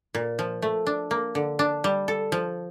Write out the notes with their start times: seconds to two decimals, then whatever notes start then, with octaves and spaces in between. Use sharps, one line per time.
0.15 A#2
0.39 F3
0.62 A3
0.86 D4
1.11 A#3
1.35 D3
1.59 D4
1.84 G3
2.08 A4
2.32 F3